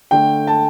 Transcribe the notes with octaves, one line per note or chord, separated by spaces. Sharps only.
D3 A3 G5
A5